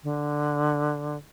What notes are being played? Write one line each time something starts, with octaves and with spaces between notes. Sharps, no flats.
D3